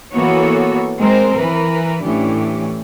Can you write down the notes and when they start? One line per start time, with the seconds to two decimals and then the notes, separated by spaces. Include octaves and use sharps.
0.13 E3 A#3 B3 F#4 A4 C#5
0.99 G#3 C4 A#4 C5
1.37 E3 A#4 B4
2.03 A2 E3 C#4 D4 G4